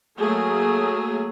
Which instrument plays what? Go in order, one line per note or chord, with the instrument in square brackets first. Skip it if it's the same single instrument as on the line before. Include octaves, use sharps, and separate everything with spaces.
[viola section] F#3 A3 A#3 G#4